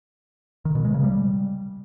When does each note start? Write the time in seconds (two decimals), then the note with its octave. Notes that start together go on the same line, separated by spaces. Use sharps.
0.65 D#3
0.75 B2
0.85 G#3
0.94 C#3
1.04 G3